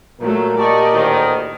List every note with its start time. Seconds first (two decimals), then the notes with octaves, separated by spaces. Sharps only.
0.20 A#2 F#3 A3 A#4
0.59 G4 D5 D#5 A5 C#6
0.93 D2 A2 D#3